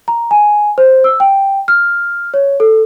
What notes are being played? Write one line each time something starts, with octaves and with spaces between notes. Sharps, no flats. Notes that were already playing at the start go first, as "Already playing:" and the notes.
A#5
G#5
C5
E6
G5
F6
C#5
A4